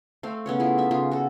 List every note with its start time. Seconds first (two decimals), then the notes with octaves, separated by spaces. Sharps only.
0.23 A3 C4 F5
0.46 C#3 B3 C#4 C#5
0.60 A3 E4 F4 G#4
0.78 D#4 E5
0.91 C#3 F4 G#5
1.11 F#4 A4